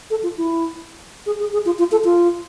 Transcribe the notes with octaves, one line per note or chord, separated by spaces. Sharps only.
A4
F4
E4
G#4
G#4
G#4
F4
F4
A4
F4